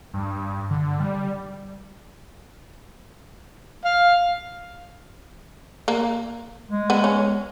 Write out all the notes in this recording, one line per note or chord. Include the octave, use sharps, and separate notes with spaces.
G2
D3
G3
F5
A#3
G#3
B3
C#4